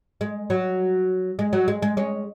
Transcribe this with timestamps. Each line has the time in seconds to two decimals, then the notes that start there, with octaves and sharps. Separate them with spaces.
0.21 G#3
0.50 F#3
1.39 G#3
1.53 F#3
1.68 G#3
1.82 G#3
1.97 G#3 C#4